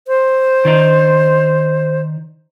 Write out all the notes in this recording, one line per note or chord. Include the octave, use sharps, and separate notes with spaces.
C5
D#3 D4 D#4